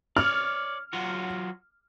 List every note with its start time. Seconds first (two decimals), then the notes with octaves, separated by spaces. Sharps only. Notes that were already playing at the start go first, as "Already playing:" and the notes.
0.17 C#5 D5 F6
0.93 F#3 F4 F#4